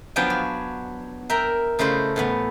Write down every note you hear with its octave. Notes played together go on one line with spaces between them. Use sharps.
F3 F#3 B3 D4 G5 G#5
F#4
A#4 E5 G5 A#5
C#3 A3 E4 C5 D#5
A2 E3 B3